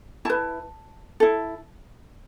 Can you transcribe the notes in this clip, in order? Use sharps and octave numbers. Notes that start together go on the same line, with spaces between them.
E4 B4 A5
E4 A4